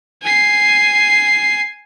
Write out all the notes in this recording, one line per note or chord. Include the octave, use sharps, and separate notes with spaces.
G#5 C7